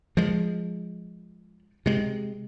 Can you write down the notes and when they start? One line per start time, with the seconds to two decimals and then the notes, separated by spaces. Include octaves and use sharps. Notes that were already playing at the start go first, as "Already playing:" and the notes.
0.17 F3 G#3
1.86 C3 G#3